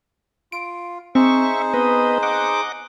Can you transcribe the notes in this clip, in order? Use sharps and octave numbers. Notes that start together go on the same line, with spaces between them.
F4 D7
C4 D#4 G#4 C5 E5 C#6
B3 B4 D#5
D#5 F#5 D6